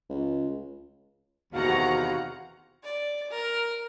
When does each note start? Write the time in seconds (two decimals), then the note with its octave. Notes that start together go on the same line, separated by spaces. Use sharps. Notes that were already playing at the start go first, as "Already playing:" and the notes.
0.09 C#2
1.53 E2 C3 D#3 F#4 F5 F#5 A#5
2.84 D5
3.30 A#4